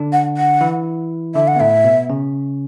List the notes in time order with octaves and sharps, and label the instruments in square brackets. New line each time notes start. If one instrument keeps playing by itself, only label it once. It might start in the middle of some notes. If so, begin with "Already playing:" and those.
Already playing: [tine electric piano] D3 D4
[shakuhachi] F#5
F#5
[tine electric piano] E3 E4
[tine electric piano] D3 D4 [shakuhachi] E5
[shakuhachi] F#5
[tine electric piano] B3
[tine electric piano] A2 A3 [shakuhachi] E5
[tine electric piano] B2 B3
C#3 C#4